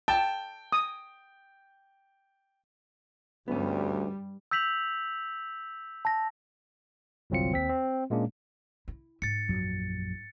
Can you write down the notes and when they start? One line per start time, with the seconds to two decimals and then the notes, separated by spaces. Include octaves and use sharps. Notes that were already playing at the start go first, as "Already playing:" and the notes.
0.08 G5 A5
0.72 D#6
3.48 D2 G2 G3 B3 C#4
4.51 E6 G6 B6 F7 F#7
6.05 A5 A#6
7.30 G1 C2 F#3 C4 F4 C#7
7.52 D#2 C4 B6
7.69 C4
8.10 A#2 G#3 A#3 C#4 D4
8.88 E4
9.22 G#2 A6 C#7
9.49 A#1 F#2 F#3